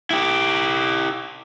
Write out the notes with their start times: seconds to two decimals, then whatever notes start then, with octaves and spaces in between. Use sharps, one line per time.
0.11 E4 G4